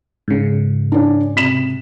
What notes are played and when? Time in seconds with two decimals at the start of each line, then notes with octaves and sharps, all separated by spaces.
0.28 G#2 C#3
0.92 C#4 D4
1.36 C3 B6 E7